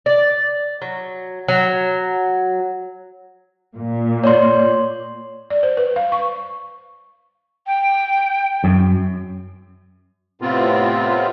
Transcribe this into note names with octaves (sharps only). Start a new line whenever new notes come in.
D5
F#3
F#3
A#2
C#5 D5 C6
D5
C5
B4
F5
C#6
G5
F#2
A2 C3 B3 C4 F4